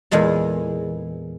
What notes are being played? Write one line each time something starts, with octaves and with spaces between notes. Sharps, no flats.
E2 A#2 G#3 A4